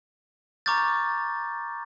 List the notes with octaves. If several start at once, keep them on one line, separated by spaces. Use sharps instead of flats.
A#5 C#6 D6 F6 G6 A6